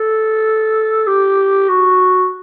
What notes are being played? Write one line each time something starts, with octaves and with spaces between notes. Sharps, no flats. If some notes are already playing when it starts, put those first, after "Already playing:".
Already playing: A4
G4
F#4